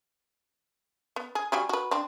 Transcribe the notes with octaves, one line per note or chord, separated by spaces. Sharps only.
B3
G#4
G3 F#4 G#4
F#4 B4
C4 D4